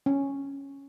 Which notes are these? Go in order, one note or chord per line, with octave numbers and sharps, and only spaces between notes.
C#4